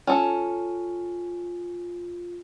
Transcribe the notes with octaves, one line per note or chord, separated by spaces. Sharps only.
C#4 F4 A4